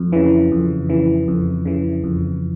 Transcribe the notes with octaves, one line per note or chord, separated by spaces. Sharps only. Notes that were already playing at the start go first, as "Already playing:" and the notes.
Already playing: F2
C#3 E3
F2
C#3 E3
F2
C#3 E3
F2